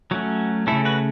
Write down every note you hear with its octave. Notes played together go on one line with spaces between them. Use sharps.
F#3 A3 C#4 F#4
C#3 A3 C#4 E4 A4
F#4 B4